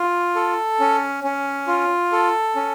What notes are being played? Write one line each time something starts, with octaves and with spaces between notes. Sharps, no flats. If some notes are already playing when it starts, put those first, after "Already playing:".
Already playing: F4
A4
C#4
C#4
F4
A4
C#4